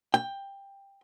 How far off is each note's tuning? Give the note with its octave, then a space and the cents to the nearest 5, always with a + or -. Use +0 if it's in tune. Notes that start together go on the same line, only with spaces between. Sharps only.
G5 +15